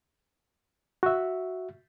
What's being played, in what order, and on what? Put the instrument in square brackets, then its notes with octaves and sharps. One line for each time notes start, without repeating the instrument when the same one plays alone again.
[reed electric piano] F#4 E5